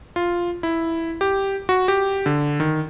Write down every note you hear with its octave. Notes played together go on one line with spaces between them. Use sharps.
F4
E4
G4
F#4
G4
D3
D#3